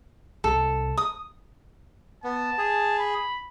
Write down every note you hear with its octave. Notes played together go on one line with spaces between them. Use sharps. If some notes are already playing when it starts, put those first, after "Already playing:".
C2 A4
D#6
B3 A5
G#4
B5